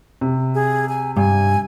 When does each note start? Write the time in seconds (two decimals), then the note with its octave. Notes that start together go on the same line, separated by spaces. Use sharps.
0.21 C3
0.55 G#4
0.89 G#5
1.16 G2 G#5